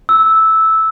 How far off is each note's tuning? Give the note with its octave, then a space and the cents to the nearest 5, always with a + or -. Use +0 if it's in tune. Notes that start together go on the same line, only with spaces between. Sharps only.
E6 -10